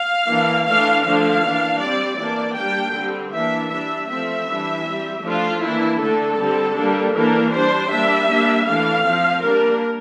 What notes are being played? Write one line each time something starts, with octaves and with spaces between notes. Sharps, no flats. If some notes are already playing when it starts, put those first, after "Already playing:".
Already playing: F5
E3 A#3 D4
E3 A3 D4 F5
D3 F3 A3 D4 F5
E3 A#3 D4
G3 C4 D5
E3 A#3 D4 D5
G3 A#3 D4 G5
D3 G3 C4
E3 A#3 D4 E5
G3 D4 E5
F3 A3 C4 E5
E3 G3 D4
G3 C4
F3 A3 D4 F4
E3 A#3 D4 E4
D3 A3 D4 A4
D3 G3 C4
G3 A#3 D4
E3 A#3 D4 A#4
G3 D4 C5
G3 A#3 D4 E5
G3 A#3 D4
E3 A3 D4 F5
F3 C4
G3 A#3 D4 A#4